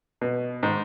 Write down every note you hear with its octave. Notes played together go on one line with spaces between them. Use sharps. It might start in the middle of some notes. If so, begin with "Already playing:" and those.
B2
G#2 D#3